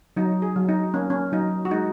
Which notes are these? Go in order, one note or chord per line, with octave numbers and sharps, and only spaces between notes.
F#3 D#4
G#4
F#3
D#4
A#3 C#4
C#4
F#3 D#4
F#4
G#3 D#4